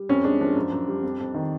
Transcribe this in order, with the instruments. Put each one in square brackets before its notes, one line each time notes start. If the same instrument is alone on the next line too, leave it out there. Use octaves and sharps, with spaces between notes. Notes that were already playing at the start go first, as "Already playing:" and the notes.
Already playing: [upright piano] G3
F2 C#4
G#3 D4
F3 D4
F#2
F#2
G3
F2
F2
D#3